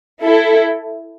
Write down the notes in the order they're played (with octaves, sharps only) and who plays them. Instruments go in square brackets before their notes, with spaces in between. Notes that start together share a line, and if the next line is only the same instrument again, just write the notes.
[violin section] E4 A4